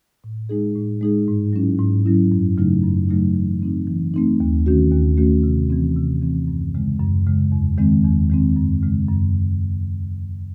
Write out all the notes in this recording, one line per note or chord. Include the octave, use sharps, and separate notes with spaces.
A2
G#3 D#4 G#4
A2
G#3 D#4 G#4
G#2
F#3 C#4 E4
G#2
F#3 C#4 E4
F#2
C#3 F#3 A3 D#4
F#2
C#3 F#3 A3 D#4
E3
A3 C4 D#4
E3
A3 C4 D#4
D#2
D#3 A3 C#4 F#4
D#2
D#3 A3 C#4 F#4
C3
E3 C4
C3
E3 C4
F#2
C#3 G#3
F#2
C#3 G#3
E2
D#3 G#3 C4
E2
D#3 G#3 C4
F#2
C#3 G#3
F#2